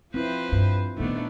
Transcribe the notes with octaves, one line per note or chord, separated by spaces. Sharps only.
F3 C4 E4 B4 C5
G2
A#2 D#3 A3 B3 D4 D#4